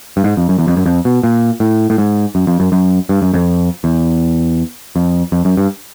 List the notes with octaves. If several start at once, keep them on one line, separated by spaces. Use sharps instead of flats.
G2
G#2
F2
F#2
E2
F2
F#2
F2
B2
A#2
A2
A2
G#2
F#2
F2
F#2
F#2
G2
F#2
F2
E2
F2
F2
F#2
G2